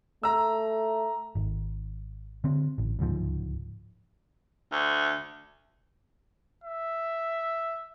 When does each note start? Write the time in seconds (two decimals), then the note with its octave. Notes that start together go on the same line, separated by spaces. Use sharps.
0.23 A3 A#5 E6
1.35 G#1
2.44 D3 C4
2.78 A1
2.99 D1 C#2 G#2 F3
4.72 D2
6.64 E5